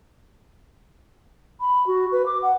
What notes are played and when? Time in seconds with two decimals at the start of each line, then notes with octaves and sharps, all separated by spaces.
1.60 B5
1.87 F#4
2.12 B4
2.26 D6
2.42 F#5